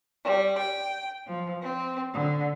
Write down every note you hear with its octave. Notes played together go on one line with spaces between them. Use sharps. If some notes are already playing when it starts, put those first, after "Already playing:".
G3
G5
F3
C4
D3